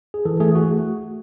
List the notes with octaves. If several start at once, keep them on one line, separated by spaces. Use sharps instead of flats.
G#4
E3 A4
A3 G#4
A3 F#4